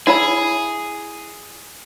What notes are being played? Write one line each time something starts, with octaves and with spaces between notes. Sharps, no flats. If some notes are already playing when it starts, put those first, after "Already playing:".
E4 G#4 C#5 B5